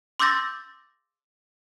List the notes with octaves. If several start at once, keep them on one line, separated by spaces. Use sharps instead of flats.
C6 D6 E6 G6 A6 A#6